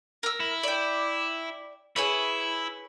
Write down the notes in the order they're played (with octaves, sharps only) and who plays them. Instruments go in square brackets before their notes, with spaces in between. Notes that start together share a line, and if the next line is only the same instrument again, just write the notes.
[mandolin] A#4 E6
[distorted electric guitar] E4
[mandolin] D5 G5
[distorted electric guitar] E4 [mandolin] G#4 B4 C#5